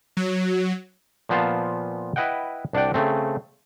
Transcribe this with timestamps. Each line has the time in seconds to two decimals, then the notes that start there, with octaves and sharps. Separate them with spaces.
0.17 F#3
1.29 A#2 F3 B3 C5 F5 A5
2.16 E4 B4 D#5 F#5 G5
2.73 C2 D4 D5 F#5 G5
2.94 C#3 A3 C4